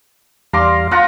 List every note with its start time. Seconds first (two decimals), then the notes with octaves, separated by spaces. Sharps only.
0.53 E2 G3 F5 A#5 C6 D6
0.91 F4 F#5 A#5